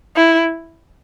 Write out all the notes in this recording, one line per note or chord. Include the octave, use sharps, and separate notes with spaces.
E4